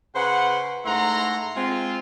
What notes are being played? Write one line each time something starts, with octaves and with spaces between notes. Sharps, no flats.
C#3 B4 C5 F#5
G#2 A3 E4 F#5 A#5 C6
G#3 C4 F4